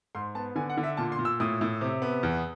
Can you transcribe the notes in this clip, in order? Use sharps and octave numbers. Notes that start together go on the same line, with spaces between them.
G#2 C6
B3 A5
D3 G#5
F#5
D3
E5
A#2 A5
C6
A#2
E6
A2 D#6
A2
C3
B3
E2